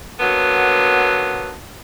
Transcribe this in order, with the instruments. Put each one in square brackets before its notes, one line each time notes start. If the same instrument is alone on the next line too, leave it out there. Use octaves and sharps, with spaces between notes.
[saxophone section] D3 F#3 A#3 B3